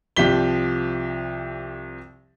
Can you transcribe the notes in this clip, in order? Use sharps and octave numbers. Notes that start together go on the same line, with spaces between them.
C2 F3 G4 B6 G7